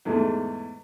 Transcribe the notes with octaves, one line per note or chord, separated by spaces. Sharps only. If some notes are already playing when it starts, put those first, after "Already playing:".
E2 G#2 A3